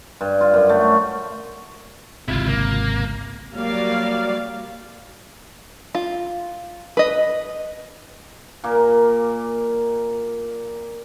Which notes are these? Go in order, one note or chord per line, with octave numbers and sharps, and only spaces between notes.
G2
F4
F#2
A3
G#1 C#2 C3 E4 F4
A#3
F#3 G3 A#3 D5 F5
F4
B4 D#5
A#2 A#3 A#4